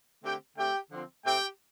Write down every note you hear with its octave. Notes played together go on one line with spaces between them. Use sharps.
D3 A3 C4 G4 G5
D3 A3 C4 G4 G5
D3 F3 C4
A2 A3 C4 G4 G5